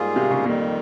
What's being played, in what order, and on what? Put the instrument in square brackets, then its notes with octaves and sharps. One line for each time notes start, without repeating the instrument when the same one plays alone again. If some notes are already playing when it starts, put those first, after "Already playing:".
Already playing: [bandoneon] G#2 G3 A#3 F4 G#4
[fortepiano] C3
C#3
[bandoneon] F2 D#3 G3 [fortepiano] A#2